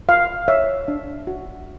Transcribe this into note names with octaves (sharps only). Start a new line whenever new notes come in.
F4 F5
C#5 E5
D4
F#4